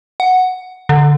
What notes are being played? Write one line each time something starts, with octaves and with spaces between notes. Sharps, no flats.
F#5
D3